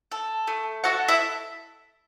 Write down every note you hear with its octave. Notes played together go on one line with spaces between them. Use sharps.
A4
A3
F#4 A4 F#5
E4 E5